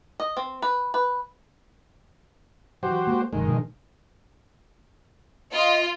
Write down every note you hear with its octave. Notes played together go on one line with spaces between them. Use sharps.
D#5
C4
B4
B4
E3 F#3 F#4 G4 C5
G#3 A#3
F1 F#2 D#3 G#3
B2 F3 D4
F4 D#5